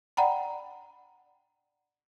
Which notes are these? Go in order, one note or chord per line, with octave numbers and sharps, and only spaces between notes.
D5 F#5 G5 A#5 B5